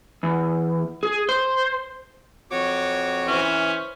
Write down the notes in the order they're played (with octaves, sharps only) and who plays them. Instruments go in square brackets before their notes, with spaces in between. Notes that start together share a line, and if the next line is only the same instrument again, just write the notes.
[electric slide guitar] E2
G#4
C5
[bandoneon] F2 F#4 D6 [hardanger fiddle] C#5
[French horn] E3 [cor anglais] C#4 [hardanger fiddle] B4 C5